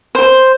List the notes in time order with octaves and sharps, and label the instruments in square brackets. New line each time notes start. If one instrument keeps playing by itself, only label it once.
[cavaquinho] C5